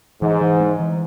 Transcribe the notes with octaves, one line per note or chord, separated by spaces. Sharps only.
G#2 E3
E3
G#3
E3